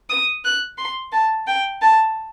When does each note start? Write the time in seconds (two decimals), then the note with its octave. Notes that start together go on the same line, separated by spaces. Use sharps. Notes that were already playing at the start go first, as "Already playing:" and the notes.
0.10 D#6
0.44 F#6
0.78 C6
1.13 A5
1.47 G5
1.82 A5